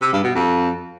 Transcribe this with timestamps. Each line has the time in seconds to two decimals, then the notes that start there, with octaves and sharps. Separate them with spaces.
0.01 C3
0.13 G2
0.24 B2
0.35 F2